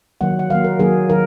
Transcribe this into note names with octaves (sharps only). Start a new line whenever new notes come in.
D#3 F#3 A#3 F#5
F#5
D#3 F#3 A#3 F5
A#4
D#3 F#3 A#3 G#4
D#3 F#3 A#4